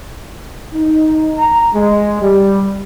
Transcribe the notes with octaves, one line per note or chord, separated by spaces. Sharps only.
D#4
A#5
G#3
G3